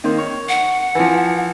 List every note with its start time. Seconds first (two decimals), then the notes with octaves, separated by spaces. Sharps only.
0.04 D#3 A#3 C4
0.18 C#5
0.49 F#5
0.95 E3 F3